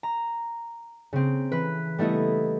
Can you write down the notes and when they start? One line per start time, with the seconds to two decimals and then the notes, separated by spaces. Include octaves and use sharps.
0.03 A#5
1.13 C#3 C4
1.52 E3 B4
1.98 G3 A3 B3 E4 D#5